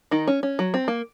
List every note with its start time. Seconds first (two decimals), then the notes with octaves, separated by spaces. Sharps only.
0.11 D#3 D#4
0.27 C#4
0.43 C#4
0.59 F#3
0.74 C4
0.88 A#3